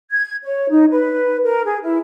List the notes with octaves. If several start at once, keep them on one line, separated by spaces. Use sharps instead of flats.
G#6
C#5
D#4
B4
A#4
G#4
E4